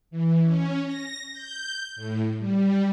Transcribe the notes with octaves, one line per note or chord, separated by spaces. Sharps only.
E3
C#4
A#6
G6
A2
G3